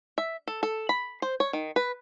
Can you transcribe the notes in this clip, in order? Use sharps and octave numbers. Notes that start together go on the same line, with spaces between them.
E5
A4
A4
B5
C5
C#5
D#3
B4